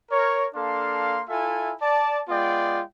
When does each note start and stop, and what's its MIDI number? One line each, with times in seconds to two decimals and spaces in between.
0.11 0.47 70
0.11 0.47 73
0.54 1.22 58
0.54 1.22 62
0.54 1.22 69
0.54 1.22 77
0.54 1.22 84
1.29 1.73 64
1.29 1.73 65
1.29 1.73 69
1.29 1.73 76
1.29 1.73 80
1.81 2.21 74
1.81 2.21 81
2.29 2.82 56
2.29 2.82 59
2.29 2.82 65
2.29 2.82 74
2.29 2.82 79